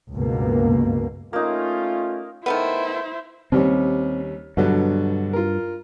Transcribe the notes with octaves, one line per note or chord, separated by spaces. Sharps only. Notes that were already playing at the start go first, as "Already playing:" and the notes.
C#2 G2 B2 A#3
A3 A#3 C#4 D#4 F4
D#3 A3 B3 E4 C5
D#2 G3 C4 C#4
G2 B2 D3 F#3
F4 A#4